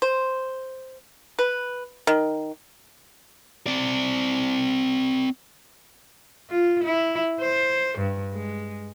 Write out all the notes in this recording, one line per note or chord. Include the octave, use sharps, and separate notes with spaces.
C5
B4
D#3
C4 D5
F4
E4
C5
G2
G#3